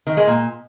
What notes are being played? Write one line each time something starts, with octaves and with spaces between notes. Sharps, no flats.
D#3
G#3
A#2